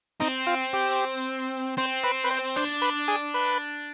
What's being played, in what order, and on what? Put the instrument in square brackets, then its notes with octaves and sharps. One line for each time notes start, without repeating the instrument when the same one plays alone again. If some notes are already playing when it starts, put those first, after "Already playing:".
[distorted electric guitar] C4 [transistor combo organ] D#4
[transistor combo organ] F4
G4
[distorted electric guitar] C4 [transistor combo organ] C5
[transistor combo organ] B4
B4
C5
[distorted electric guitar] D4 [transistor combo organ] C5
[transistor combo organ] B4
G#4
B4